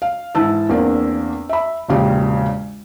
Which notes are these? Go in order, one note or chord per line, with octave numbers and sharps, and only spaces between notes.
F5
G#2 E3 A5 E6
E2 A#3 C4 D4
E5 B5
E1 A#1 C#3 G4